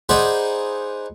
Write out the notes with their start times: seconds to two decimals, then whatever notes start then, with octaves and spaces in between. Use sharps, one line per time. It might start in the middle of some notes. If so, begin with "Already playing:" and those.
0.09 D#4 G#4 C5 D5 F#5 B5